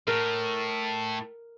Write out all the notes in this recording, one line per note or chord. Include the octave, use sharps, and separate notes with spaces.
A2 A#4